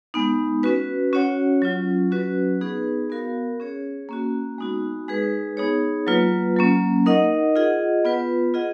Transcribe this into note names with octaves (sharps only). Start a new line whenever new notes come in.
G#3 B3 D#4
C#4 F#4 B4
C#4 F#4 C#5 F#5
F#3 C#4 F4
F#3 C#4 F#4 B4
B3 D#4 G#4 B4
B3 F#4 A#4 F5
C#4 G#4 C#5
A#3 C#4 F#4
G#3 B3 D#4 F#4
G#3 D#4 G#4 B4
B3 D#4 G#4 C#5
F#3 A#3 F4 B4
F#3 A#3 C#4
D#4 A#4 D#5 F#5
F4 G#4 D#5 F#5
B3 F4 B4
F4 G#4 D#5 F#5